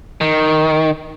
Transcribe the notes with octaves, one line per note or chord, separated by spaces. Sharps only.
D#3